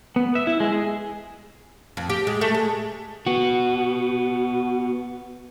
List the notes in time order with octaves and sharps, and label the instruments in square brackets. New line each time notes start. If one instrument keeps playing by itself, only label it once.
[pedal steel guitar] B3
E5
E4
G#3
G#4
[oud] F2
G4
G#3
A3
G#3
[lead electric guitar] B3 F#4